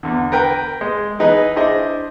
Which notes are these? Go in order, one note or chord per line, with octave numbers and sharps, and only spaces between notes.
E2 D3
A#4 B4 G5
G#3
E3 B3 D#4 G#4 B4 D#5
D4 E4 G#4 C5 D#5